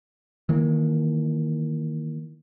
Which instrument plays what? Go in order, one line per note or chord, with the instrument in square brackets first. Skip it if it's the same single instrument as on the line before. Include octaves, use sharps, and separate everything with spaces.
[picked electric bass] D#3 E3 A#3